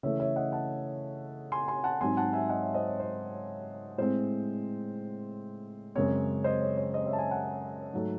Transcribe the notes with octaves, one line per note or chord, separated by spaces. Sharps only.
C#3 E3 A3 C#5 E5
C#5 E5
D#5 F#5
F#5 A5
G#5 C6
G#5 C6
F#5 A5
G#2 F#3 C4 G#5 C6
F#5 A5
E5 G#5
D#5 F#5
C#5 E5
C5 D#5
C#5
C5
A2 G#3 C4 C5
F#2 C#3 G#3 C4 C#5
C5 D#5
C#5
C5
C5 D#5
C#5 E5
A5
E5 G#5
F#5 A5
G#2 F#3 A3